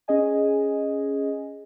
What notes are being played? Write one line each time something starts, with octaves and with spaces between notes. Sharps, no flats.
C#4 G#4 D#5 G#5